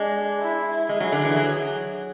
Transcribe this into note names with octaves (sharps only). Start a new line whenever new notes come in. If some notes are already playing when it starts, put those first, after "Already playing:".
Already playing: G#3 D4
E4
G#3 G#4
F#3
D3
E3
F#3